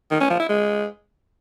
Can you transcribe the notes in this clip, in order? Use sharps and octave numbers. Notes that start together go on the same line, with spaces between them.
D#3
C#4
F3
E4
G#3